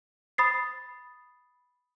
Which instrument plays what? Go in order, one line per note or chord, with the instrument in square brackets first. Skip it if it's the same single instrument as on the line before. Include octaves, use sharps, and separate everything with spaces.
[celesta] B5 D#6 A6 C7